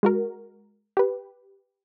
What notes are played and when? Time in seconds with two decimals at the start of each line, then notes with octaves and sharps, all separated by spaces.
0.03 G#3 F#4 A#4
0.97 G4 B4